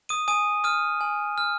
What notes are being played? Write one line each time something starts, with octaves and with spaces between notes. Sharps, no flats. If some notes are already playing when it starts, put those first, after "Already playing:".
D#6 D#7
G#5 D#6 D#7
D#6 F6 D#7
G#5
F6